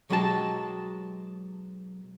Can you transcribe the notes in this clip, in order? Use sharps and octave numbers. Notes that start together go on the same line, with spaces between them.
B1 F#3 G#3 G4 A#4 A5